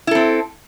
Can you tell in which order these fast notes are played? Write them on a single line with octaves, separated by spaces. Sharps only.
E4 A4 C4